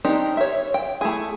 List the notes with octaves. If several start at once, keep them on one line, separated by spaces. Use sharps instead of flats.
C4 D4 D#4 G4 A#4
C#5 E5
G5
A3 E4 G#4